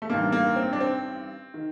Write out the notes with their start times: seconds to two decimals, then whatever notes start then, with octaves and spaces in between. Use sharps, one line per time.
0.02 A3
0.09 A1 G2 D#3 A#3
0.32 A#3
0.56 C4
0.73 D4
0.81 C4
1.54 D#3